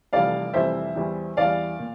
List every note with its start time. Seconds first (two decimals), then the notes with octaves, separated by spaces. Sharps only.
0.13 F1 F2 E3 G3 D5 F5
0.54 F1 F2 E3 G3 C5 E5
0.96 E2 E3 G3
1.37 E2 E3 G3 D5 F5
1.79 A#2